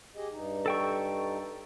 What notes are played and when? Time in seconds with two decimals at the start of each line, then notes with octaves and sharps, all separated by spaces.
0.16 G4 G#4 D#5
0.31 G2 D#4
0.66 A4 G5 C#6